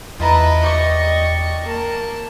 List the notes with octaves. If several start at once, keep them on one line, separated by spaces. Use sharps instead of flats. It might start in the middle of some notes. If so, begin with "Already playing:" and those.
E2 E4 F4 B4 D#5 A5 A#5
G4 D5 C#6
A#3 A5